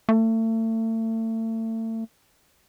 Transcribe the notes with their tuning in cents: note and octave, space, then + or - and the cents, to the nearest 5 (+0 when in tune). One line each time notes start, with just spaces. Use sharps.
A3 +35